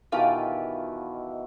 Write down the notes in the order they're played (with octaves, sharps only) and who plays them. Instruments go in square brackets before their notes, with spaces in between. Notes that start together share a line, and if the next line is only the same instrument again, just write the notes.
[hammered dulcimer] B2 D#3 E3 [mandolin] F4 G4